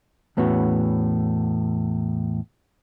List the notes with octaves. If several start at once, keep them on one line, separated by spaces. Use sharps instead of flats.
E2 A2 B3 C#4 F#4